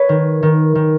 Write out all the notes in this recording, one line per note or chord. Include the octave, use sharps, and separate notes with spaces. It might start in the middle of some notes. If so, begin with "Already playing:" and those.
Already playing: B4 C#5
D#3
D#3
D#3